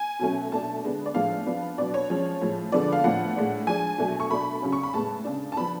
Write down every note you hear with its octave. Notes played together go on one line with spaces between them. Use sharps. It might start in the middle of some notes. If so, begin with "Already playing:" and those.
Already playing: G#5
B2 F#3 A3 C#4
B2 A3 D4 A5
D3 G#3 B3 D4
D5
A2 F3 G#3 B3 D4 F5
F3 B3 D4
B2 F#3 B3 D4 D5
C#5
F3 G#3 C#4
A2 F3 G#3
D3 F3 G#3 B3 D5
F5
A2 F3 B3 D4 F#5
A2 G#3 D4
F3 G#3 D4 G#5
B2 F#3 A3 D4
C#6
B2 A3 D4 B5
C#3 F#3 C#4
C#6
B5
A2 G#3 B3 A5
C#3 G#3 D4
A5
F3 B3 D4 B5